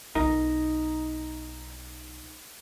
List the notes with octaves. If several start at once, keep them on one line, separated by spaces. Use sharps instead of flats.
B1 D#4 F4 A#4